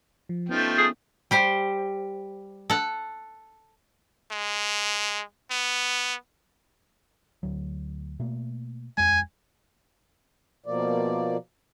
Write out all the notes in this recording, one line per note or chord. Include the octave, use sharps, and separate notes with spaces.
F3
F3 A3 B3 C#4 D#4 G5
G#4
G3 G4 C5
A4 F#5
G#3
B3
D2 F#3
B2 A3 A#3
D#1 F2 G#3 G#5
B2 F3 A#3 D5